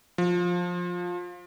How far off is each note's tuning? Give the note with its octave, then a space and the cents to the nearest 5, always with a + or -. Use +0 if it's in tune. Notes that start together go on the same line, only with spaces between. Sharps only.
F3 +15